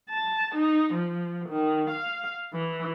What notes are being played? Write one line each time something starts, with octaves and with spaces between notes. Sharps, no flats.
A5
D#4
F3
D#3
F5
E3